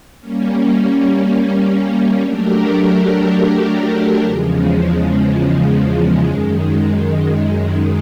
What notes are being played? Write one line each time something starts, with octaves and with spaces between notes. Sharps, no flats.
G3 A#3 C#4
F#3 A3 D4 G4 A#4
E2 C#3 F3 G#3
F#2 D#3 G#3